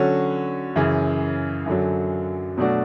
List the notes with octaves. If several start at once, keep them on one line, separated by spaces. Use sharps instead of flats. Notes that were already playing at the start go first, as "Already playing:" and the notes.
Already playing: D3 F#3 C#4 F#4
F#2 C#3 E3
F#2 D3 F#3
B2 F#3 A3 D4 F#4